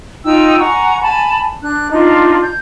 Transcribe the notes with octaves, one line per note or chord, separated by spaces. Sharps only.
D#4 F4 G5 E6
F#5 G#5 A#5 C#6
G#5 A5 B5
D4 F#6
D4 D#4 F4 D#5
G6